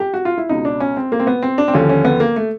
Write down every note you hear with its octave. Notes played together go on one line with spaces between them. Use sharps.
G4
F#4
F4
E4
C#2 B2 D#4
D4
C#4
C4
A#3
C4
B3
C4
D4
C4
D#2 D3 F3 C#4
C#4
B3
A#3
A3